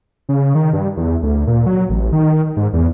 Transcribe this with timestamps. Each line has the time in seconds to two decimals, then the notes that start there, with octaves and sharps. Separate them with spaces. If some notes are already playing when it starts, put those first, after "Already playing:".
0.29 C#3
0.55 D#3
0.73 G2
0.97 E2
1.23 D2
1.47 A#2
1.66 F#3
1.90 A1
2.13 D#3
2.57 G#2
2.73 E2